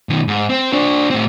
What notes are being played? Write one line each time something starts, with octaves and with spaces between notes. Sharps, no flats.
B2 D#3
G#2
C4
D4 C5
A2 C4